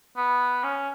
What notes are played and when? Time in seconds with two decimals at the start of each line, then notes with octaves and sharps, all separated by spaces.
0.17 B3
0.64 C#4